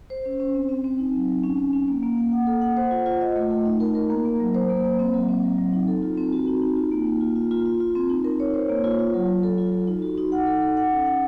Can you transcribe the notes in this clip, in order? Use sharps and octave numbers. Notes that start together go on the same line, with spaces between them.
C5
C#4
C#4
C4
C4
C4
D#4
F#3
F#3
C#4
C#4
C#4
A#3
A#3
A#3
F#5
A4
F#5
C5
F4
F4
D#5
A3
A3
D#4
A#4
A#4
A#3
A#3
F#3
C5
A#3
A#3
C4
F#3
C4
F#3
F#3
D#4
A4
F4
C4
F#4
D#4
D#4
F4
A#3
A#3
F4
F4
F4
F4
F4
C4
D#4
A#4
C#5
C5
A#3
F4
F4
F#3
F#3
A4
F4
F4
D#4
F#4
D#4
F#5
A4
A4
F#5
C#4
F#5